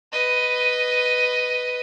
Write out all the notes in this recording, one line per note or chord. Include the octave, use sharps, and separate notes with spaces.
B4 D#5